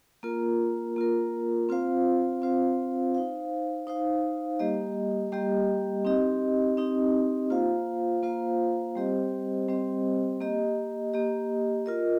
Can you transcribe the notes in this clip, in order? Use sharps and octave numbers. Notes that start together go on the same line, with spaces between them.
A#3 F4 A#4
A#3 F4 A#4
C4 F4 C5 F5
C4 F4 C5 F5
D#4 C5 F5
D#4 C5 F5
G3 A#3 G4 D#5
G3 A#3 G4 D#5
C4 D#4 G4 D#5
C4 D#4 G4 D#5
A#3 F4 C5 F5
A#3 F4 C5 F5
G3 C4 G4 C5 D#5
G3 C4 G4 C5 D#5
A#3 G4 D#5
A#3 G4 D#5
F4 A#4 D#5